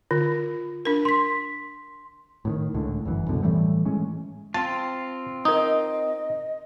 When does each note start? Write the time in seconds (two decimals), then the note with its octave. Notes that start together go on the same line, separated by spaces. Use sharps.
0.11 D3 F4
0.85 D4 A#4
1.05 C6 B6
2.45 A2 D3 D#3
2.74 C#2 A2 D3
3.05 G1 F#2 E3
3.28 C2 F#2 B2 D3
3.43 A2 E3 G3 A3
3.85 A2 E3 G#3 C#4
4.54 C4 F4 A5
5.45 D#4 A#4 D#5 D#6